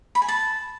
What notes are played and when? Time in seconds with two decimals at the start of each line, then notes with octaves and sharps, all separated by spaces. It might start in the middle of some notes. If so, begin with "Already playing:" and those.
0.15 B5
0.22 G#5
0.28 A5